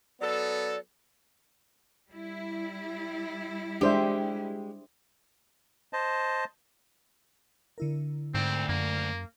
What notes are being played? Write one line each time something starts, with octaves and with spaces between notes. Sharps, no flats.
F#3 B3 A4 D5
G3 E4
G#3 D4 G4 C5 E5
C5 D#5 A5
D3 E4 A#4
D2 G#2 C4
F#2 A#3